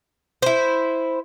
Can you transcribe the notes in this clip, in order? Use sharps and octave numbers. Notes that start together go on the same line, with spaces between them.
E4 C5